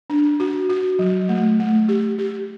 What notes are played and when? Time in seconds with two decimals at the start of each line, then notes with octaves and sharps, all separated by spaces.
0.10 D4
0.40 F#4
0.69 F#4
0.99 F#3
1.29 A3
1.59 A3
1.89 G4
2.18 G4